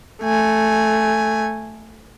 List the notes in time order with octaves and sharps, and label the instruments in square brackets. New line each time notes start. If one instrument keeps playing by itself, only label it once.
[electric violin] A3 G#5